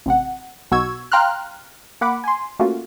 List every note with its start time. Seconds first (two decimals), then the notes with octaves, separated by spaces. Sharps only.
0.06 A1 C3 F#5
0.71 B1 B2 F#4 C#6 E6 G#6
1.12 F5 G5 A#5 C6 F6 F#6
2.01 A#3 F#5 B5 D6
2.24 G#5 C6
2.59 A3 A#3 C#4 F4 F#4